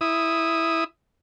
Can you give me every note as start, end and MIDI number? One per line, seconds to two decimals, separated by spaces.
0.01 0.84 64
0.01 0.84 87